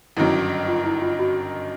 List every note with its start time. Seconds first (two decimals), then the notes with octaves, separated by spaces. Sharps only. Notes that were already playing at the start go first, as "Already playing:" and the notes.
0.17 G1 F#2 D#3 F#3 E4
0.68 F4
0.85 E4
1.02 F4
1.19 F#4